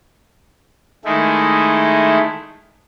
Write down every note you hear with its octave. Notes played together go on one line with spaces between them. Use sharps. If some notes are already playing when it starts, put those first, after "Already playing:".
D#3 G#3 A3 E4